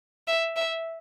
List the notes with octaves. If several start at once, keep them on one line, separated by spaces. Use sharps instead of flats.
E5
E5